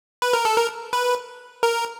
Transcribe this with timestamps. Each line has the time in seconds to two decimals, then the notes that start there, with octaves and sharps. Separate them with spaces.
0.22 B4
0.33 A#4
0.45 A4
0.56 A#4
0.93 B4
1.63 A#4